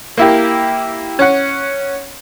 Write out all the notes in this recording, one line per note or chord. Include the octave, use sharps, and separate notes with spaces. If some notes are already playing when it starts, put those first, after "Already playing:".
A#3 E4 G4
C#4 F#5